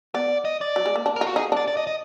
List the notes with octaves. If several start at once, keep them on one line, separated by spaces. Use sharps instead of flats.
B3 D5
D#5
D5
F#3
G#3
A#3
D4
A#4
F4
F#4
D#4 G#4
D4 D5
D5
D#5
D#5